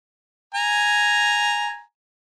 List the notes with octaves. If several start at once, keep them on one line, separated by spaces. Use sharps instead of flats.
G#5 A#5